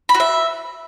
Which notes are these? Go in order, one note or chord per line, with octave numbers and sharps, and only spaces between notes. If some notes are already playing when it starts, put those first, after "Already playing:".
B5
F#4
E5